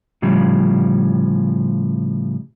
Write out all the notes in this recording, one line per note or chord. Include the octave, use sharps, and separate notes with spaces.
A2 C#3 F3 G3